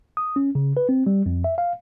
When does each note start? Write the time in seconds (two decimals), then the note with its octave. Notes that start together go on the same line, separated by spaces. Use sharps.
0.17 D#6
0.36 C#4
0.55 C#3
0.77 B4
0.89 C4
1.07 G3
1.26 F2
1.44 E5
1.58 F5